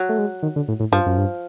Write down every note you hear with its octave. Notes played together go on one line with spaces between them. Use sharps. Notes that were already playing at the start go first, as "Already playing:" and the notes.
Already playing: F#3
A3
G#3
D#3
D3
A2
A2
G2 F3
F#2
G2